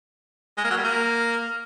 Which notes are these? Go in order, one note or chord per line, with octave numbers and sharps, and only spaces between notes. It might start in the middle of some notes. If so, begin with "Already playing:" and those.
G#3
A#3
F#3
G3
A#3